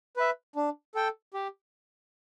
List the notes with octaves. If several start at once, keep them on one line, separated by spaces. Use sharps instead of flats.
B4 E5
D4
A4 G5
G4